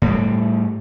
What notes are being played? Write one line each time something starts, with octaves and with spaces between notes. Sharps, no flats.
A2 G3